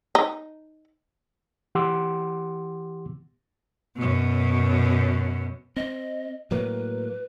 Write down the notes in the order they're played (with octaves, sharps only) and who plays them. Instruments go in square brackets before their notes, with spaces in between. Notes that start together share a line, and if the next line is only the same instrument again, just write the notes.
[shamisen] D#4
[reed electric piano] E3 G4 F#5 C6 D6 E6
[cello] F#2 B2
[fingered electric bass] C4 [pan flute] D#5
[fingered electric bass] A2 F#3 A#3 [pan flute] B4